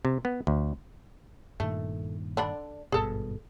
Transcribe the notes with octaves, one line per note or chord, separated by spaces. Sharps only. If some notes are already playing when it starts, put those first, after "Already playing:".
C3
B3
D2
G2 A#2 D#3 A3
D3 D4 B5
G#1 G2 B2 G#4 A4